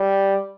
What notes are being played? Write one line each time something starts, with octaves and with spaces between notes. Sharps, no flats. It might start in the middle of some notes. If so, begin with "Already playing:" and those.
Already playing: G3